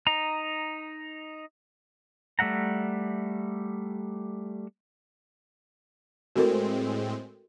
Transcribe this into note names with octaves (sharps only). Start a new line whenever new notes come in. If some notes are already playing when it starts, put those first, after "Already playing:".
D#4 A#5
G3 A3 E5 F#5 A#5
A2 G#3 C4 F#4 A4 A#4